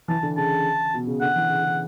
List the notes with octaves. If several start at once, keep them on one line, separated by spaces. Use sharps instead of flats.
E3 A5
D3
C#3 A5
B2
C#3
D3 F#5
E3
C#3
C#3